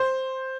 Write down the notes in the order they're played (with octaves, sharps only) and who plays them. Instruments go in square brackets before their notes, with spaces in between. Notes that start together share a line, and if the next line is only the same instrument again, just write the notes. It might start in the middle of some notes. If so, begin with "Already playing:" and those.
Already playing: [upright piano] C5